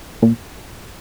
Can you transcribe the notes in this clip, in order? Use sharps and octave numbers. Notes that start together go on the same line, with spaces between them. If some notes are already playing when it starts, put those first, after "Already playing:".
A#2